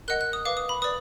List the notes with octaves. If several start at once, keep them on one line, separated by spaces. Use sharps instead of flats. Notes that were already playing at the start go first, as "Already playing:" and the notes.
A#4 D#5 F#5 F#6
F#6
D#6
B4 F5 D6
D#6
B5
B4 D5 D#6